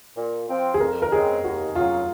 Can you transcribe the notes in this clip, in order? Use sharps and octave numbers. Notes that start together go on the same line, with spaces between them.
A#2
F3 C4
G#4
F2 A#4
A#4
C#3 G#3 C4 G#4
D#2 F#4
C#3 F#3 F4